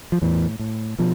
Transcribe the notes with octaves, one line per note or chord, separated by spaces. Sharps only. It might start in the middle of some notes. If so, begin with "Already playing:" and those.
F3
E2 A2 E3
A2
B2 F3